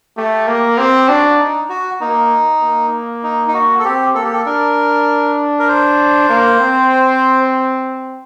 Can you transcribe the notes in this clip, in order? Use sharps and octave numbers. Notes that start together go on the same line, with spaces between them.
A3 G4
A#3
C4 G4
D4 F#4
D#4
F#4
A#3 D#4
A#3
D#4
D#4
F#4
A4
C4 G4
A#3 A4
G4
A4
D4 A#4
A#4
C5
A#3
C4